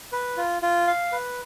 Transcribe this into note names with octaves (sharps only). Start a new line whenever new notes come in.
B4
F4
F4
F5
B4